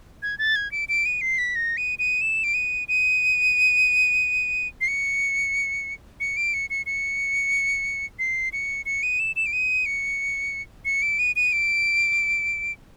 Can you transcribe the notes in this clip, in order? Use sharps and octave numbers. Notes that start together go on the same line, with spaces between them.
G#6
A6
G#6
D7
D7
D#7
C7
B6
A#6
D#7
D#7
E7
D7
D#7
D#7
C7
C#7
C#7
D7
C#7
C#7
C#7
C7
C#7
C#7
D#7
E7
E7
D7
D#7
C#7
C#7
D7
D#7
D#7
D7